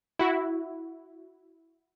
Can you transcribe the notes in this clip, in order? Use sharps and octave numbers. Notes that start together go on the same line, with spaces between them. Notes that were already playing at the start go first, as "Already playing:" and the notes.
E4 F#4